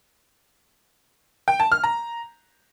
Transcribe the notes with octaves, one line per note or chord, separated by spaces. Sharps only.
G5
A5
F6
A#5